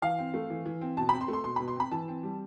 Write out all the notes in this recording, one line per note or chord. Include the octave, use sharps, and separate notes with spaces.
E3 F5
C4
A3
E3
E3
C4
B2 A5
C4 B5
C6
A3
C6
B2 C6
B2 B5
C6
C4 B5
E3 A5
C4
G3